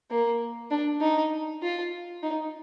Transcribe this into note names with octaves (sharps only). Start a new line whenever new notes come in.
A#3
D4
D#4
F4
D#4